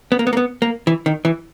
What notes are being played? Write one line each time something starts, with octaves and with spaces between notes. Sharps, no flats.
B3
A#3
B3
A#3
B3
A#3
E3
D#3
E3